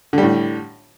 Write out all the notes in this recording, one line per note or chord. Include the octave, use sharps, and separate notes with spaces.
A2 D3 G3